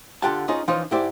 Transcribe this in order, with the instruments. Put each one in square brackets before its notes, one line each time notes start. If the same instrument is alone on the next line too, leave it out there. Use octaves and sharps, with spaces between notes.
[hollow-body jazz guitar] D3 F4 G4 F#5 G5 A5
C#4 D#4 F4 G#4 C#5 D#5
E3 F3 C#4 D#4 F4
G#2 E4 G4 C5 D5